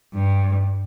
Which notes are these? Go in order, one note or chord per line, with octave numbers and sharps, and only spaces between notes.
G2